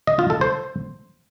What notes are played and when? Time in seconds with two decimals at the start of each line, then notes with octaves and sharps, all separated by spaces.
0.07 D#5
0.19 F4
0.30 A4
0.41 C5